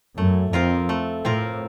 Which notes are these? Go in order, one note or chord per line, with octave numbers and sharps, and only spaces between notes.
F#2 A3
F2 C4 F4 A#4
A3
A2 C4 F4 A#4